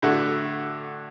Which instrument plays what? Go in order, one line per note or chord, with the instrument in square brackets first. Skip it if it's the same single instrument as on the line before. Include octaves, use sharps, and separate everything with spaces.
[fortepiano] A2 D3 A3 F#4